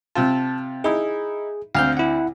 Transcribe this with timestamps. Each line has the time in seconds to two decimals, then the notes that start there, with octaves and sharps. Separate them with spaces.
0.15 C3 C4 F4 A5
0.84 D#4 E4 G#4
1.75 D2 C4 F5 F6 G6
1.97 E4 F#5